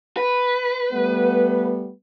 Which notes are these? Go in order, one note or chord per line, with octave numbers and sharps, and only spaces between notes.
B4
G3 A3 B3